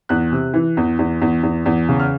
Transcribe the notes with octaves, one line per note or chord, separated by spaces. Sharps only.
E2 F#6
C3
E3
E2
E2
E2
E2
E2
C#3
F6